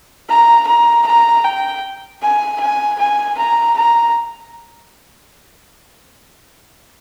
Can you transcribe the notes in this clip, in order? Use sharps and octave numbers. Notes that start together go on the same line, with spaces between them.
A#5
A#5
A#5
G5
G#5
G#5
G#5
A#5
A#5